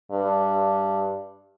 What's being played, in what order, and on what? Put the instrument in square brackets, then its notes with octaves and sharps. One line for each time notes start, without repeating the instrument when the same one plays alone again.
[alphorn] G2